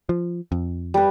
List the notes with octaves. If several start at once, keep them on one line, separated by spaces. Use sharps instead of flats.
F3
F2
G3 B4